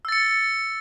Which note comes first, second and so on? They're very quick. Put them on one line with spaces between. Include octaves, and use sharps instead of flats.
E6 A6 C#7